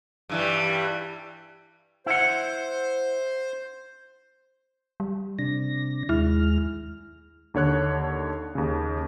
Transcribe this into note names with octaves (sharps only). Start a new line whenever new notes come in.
G2 E3 G3
E4 C5 F#5
G3
C3 D4 A#6
D#2 G#3 E4 F6
D#2 D3 C#5 F#6
D#2 C#3